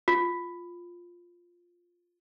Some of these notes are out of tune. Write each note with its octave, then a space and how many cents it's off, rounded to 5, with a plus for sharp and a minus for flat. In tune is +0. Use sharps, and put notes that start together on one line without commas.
F4 +5